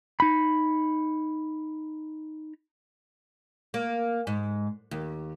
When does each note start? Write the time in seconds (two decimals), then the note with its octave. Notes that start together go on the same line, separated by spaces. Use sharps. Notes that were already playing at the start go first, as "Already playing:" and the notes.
0.20 D#4 B5
3.74 A#3
4.27 G#2
4.91 D#2